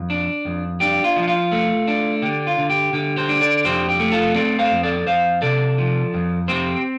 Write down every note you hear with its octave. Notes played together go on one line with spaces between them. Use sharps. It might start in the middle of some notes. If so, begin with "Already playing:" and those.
Already playing: F2
D4
F2
D4 G4
F4
F3
F4
A3
D4
D3 G4
F4
D3
G4
D3 G4
G4 C5
D4
A4 D5
F2 G4 C5
G4
A3
F4 A4
C4 A4 D5
C5 F5
F2
A4 D5
F2 C5 F5
C3 A4 D5
F3
F2
C4 G4 C5